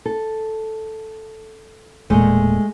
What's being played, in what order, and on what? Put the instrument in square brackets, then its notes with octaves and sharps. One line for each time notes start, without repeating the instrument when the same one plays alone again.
[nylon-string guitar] A4
[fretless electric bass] E1 A#2 [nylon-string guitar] G#3 A3